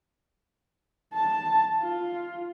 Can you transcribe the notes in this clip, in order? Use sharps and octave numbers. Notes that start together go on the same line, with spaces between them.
A5
F4